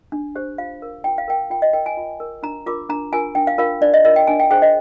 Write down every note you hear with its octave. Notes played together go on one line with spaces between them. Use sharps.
D4
G4 C5
F4 F5
A#4
F4 G5
F5
A#4 G5
F4 G5
D#5
A#4 G5
G#5
F4
A#4
D4 A#5
F4 A#4 D6
D4 A#5
F4 A#4 G#5
D4 G5
F5
F4 A#4 F5
D4 D5
D#5
F4 A#4 D#5
G5
D4 G#5
G5
G#4 C5 G5
D#5